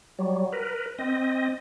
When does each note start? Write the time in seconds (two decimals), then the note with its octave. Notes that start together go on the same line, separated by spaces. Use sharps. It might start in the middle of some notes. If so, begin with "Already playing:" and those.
0.19 F#3 G3
0.52 A#4 B4
0.99 C4 D#5